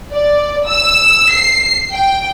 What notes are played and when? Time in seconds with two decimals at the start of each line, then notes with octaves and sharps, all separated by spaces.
0.12 D5
0.66 E6
1.30 C7
1.91 G5